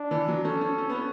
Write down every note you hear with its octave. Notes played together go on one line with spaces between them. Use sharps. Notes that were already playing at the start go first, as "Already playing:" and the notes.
Already playing: D4
E3
F#3
C#4 A4
C#4
C#4
B3
C#4